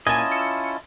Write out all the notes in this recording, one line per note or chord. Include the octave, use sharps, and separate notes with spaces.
A#2 C#4 E4 F4 D#5 G#5 A5 G#6
E6 C#7